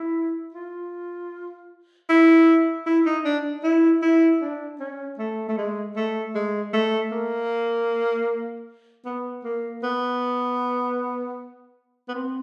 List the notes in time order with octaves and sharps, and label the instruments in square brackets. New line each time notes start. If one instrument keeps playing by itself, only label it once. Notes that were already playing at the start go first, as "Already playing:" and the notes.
Already playing: [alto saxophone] E4
F4
E4
E4
D#4
D4
E4
E4
D4
C#4
A3
A3
G#3
A3
G#3
A3
A#3
B3
A#3
B3
B3
C4